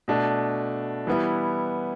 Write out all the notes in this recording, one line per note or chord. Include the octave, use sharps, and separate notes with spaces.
B2 A3 D4
E3 G3 B3 E4